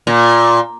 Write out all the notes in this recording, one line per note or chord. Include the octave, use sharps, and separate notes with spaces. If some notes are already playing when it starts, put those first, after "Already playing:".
A#2